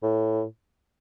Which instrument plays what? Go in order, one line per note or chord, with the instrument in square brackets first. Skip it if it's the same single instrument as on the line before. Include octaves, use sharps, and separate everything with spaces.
[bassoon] A2